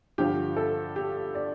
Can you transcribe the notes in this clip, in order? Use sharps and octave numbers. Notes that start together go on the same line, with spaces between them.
G2 D3 F3 G4
A4
G4
D5